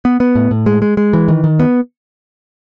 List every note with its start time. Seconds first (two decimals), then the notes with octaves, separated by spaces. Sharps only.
0.05 B3
0.20 B3
0.35 A2
0.51 A2
0.66 G#3
0.82 G#3
0.97 G#3
1.13 E3
1.28 D#3
1.44 D#3
1.60 B3